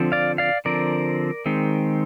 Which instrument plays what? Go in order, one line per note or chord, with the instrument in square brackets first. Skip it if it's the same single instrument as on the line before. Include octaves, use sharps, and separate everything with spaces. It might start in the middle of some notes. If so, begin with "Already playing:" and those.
Already playing: [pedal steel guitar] D3 F3 C4
D5 F5
D5 F5
D3 F3 C4 A#4 D5
D#3 G#3 C4